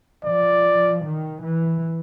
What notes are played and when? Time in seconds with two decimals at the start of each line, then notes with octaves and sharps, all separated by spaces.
0.24 F3 D5
1.04 D#3
1.43 E3